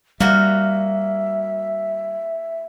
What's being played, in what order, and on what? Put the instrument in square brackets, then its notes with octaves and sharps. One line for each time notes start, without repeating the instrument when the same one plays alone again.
[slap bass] G3 [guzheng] A#3 F#4 [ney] E5